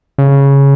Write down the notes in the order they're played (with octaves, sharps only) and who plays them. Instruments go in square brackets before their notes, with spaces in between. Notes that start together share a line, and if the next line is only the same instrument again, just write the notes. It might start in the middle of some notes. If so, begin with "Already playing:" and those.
[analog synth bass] C#3